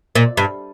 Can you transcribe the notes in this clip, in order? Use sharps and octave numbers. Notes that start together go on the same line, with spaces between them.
A#2
G2